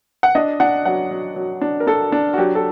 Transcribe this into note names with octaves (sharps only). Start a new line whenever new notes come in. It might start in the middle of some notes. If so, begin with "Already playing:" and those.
F#5
D4 D#5
D4 F#5
F#3 F#5
F#3
F#3
D4
A#4
D4 A4
D4
F#4
F#3 G4
A4